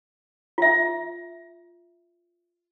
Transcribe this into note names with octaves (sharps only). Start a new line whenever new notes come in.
F4 E5